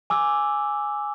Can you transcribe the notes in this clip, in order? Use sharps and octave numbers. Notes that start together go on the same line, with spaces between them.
G#5 D6 E6